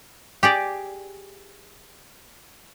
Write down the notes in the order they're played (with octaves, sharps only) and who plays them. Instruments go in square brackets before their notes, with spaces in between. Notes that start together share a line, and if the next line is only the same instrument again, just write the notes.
[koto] G4 G#4 D5